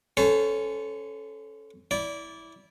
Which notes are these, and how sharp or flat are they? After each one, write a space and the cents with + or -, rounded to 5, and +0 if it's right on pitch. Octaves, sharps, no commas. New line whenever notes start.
C#4 +0 A4 -15 C5 -40
E4 -15 D5 -20